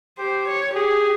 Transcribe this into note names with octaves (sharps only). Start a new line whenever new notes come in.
G4 C5
C#5
G4 G#4